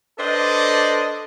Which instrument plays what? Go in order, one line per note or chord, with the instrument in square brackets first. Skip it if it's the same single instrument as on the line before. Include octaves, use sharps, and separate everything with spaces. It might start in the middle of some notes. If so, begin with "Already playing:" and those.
[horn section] D4 A4 B4 C5 D5 D#5